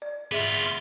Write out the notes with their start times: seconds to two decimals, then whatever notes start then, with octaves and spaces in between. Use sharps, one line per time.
0.02 D5
0.32 B3 F4 G#4 E5